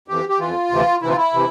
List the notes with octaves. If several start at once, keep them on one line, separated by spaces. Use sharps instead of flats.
F2 E3 G4
G4
F2 E3 F4
D2 C3 E3
D2 C3 E3 E4
F4
E4
C3 E3